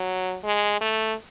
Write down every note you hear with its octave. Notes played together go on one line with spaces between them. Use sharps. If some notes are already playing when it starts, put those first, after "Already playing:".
Already playing: F#3
G#3
A3